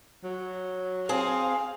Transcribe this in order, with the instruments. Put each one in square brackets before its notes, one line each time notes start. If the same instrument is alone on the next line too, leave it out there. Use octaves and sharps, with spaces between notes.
[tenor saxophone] F#3
[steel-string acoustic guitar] C4 G#4 C5 [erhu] F5